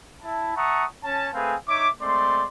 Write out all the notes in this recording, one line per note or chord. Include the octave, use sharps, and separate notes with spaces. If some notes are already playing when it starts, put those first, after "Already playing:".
E4 A5
E5 F#5 A5 A#5 C#6 D#6
C#4 A5
A3 C4 G#4 B4 F5 G#5
D#4 C#5 E5 D6
G#3 A3 C4 D5 C6